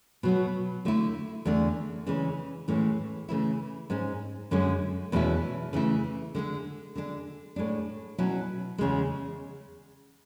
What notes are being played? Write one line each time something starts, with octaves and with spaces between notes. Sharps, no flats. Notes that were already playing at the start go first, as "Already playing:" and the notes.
B2 F#3 B3
D3 A3 E4
E2 D3 A3 D4
C#3 E3 G#3 C#4
A2 E3 G#3 C#4
C#3 E3 A3 E4
G#2 G#3 C#4
F#2 D3 G#3 C#4
E2 B2 G#3 C#4 E4
C#3 E3 A3 E4
D3 G#3 D4
D3 G#3 D4
A2 G#3 D4
B2 F#3 C#4 E4
E2 C#3 G#3